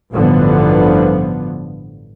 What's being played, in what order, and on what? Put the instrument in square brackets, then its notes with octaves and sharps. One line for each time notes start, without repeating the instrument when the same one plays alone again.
[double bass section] A1 G2 D3 F3 B3